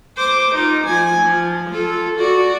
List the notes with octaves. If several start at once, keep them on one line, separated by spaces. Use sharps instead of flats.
C5 D6
D#4 F4
F3 G#5
F3
F4 A4
F#4 D5